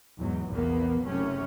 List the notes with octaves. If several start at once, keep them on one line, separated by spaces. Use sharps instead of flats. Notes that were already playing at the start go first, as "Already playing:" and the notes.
E2 G#2 F#3
A#1 E2 C3 A#3 B3
F#1 F#2 C3 A3 C#4